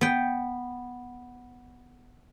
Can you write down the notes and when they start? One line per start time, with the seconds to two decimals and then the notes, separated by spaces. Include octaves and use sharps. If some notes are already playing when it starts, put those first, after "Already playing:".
0.01 B3 G5